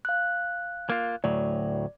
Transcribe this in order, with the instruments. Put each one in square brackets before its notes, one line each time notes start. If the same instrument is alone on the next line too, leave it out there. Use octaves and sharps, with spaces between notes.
[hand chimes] F5 F#6
[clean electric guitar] A#3 F4
[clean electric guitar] D2 A2 F#3 [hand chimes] D5